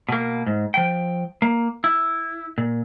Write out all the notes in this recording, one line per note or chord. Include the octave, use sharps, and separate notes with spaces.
B2 A#3
G#2
F3 G5
A#3
E4
A#2